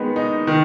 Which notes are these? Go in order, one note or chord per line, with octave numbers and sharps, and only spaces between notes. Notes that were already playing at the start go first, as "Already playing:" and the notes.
Already playing: D#3 G#3 B3
D#4
D#3